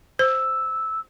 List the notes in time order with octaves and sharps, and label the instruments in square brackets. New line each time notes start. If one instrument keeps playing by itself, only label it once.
[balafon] C5 [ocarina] E6